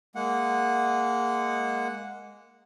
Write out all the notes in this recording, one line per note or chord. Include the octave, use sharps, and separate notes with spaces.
G#3 A#3 F#5